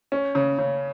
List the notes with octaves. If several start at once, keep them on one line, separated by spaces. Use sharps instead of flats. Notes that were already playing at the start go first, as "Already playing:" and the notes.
C#4
C#3
C#3